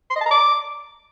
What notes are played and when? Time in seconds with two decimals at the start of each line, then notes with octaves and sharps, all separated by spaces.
0.11 C6
0.16 D#5
0.21 A5
0.26 A#5
0.31 D6